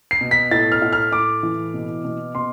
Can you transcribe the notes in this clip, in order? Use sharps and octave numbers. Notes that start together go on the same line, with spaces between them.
C7
B2
B6
A2 A6
F6
A2
F6
A2 D6
E3
B2
B2
B2 C6